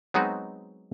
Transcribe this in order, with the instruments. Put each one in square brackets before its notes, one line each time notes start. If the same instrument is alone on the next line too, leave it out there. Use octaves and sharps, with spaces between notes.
[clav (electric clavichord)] F#3 G#3 B3 C4 D#4 F#4